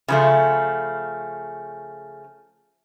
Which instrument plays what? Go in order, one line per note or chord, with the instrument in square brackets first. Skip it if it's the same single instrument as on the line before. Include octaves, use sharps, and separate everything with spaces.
[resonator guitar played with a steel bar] C#3 F3 A3